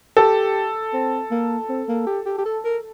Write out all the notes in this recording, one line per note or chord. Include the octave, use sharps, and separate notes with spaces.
G4 A4
C4
A#3
C4
A#3
G4
G4
G4
A4
A#4